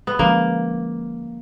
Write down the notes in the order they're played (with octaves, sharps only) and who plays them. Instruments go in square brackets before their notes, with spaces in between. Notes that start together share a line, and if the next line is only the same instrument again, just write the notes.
[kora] B3
[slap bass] D3 F3 G#3 C#4 [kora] A#3